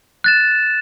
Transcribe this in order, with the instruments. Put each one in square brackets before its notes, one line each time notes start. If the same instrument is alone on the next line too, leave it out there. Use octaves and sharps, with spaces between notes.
[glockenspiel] F#6 A6 E7